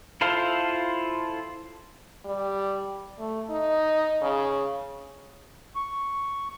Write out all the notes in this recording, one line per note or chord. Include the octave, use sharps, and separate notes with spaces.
E4 F4 A4 C5 F5
G3
A3
D#4
C#3
C#6